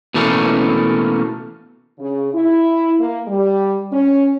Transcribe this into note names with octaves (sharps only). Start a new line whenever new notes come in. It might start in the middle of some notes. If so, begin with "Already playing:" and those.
B2 E3 A3 A#3 C#4
C#3
E4
A#3
G3
C#4